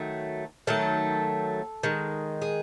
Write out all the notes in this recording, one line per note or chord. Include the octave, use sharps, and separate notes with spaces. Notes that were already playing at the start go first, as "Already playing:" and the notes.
Already playing: D#3 F#3 A3
D#3 F#3 A3 A4
D#3 G#3
G#4